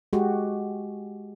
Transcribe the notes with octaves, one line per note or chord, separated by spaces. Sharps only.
G#3 F#4 G4